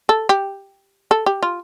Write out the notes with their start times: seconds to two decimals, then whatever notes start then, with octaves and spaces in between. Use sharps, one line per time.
0.09 A4
0.29 G4
1.11 A4
1.26 G4
1.43 F4